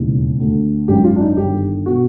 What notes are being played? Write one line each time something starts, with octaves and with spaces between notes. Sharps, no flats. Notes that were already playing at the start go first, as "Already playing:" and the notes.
Already playing: E1 D#2 C#3 E3
D2 D3
G#1 F#2 D#3 G4
F4
D4
D#4
G1 G2 D#3 G4
B2 F#4